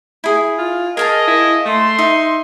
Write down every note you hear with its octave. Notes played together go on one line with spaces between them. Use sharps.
E4 G#4
F4
G#4 A#4 D#5 F5 A5
E4
A3 C6
D#4 E5